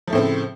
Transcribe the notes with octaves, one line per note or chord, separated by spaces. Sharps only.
A2 C#3 F3 A3 C4